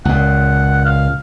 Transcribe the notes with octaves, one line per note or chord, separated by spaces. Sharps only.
C#2 A#2 F#5
F5